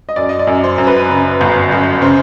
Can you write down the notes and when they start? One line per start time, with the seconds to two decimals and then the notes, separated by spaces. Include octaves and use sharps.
0.09 D#5
0.16 F#2 D5
0.29 D#5
0.39 D5
0.47 F#2
0.64 C5
0.78 F#2
0.87 B4
1.09 C#3
1.41 G1
1.72 F#2
2.02 C#3 C5